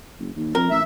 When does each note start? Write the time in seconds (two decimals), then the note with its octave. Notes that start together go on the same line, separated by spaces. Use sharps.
0.20 F#1
0.36 D#2
0.55 F2 A#4
0.70 A1 E5